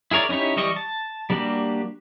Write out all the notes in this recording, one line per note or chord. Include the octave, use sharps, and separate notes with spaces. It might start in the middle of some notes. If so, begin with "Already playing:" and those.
E4 G#4 A#4 C#5 D5
C#4 D#4 E4 G4 C#5
E3 G3 D#5 C#6
A5
G3 A#3 D4 F#4 G4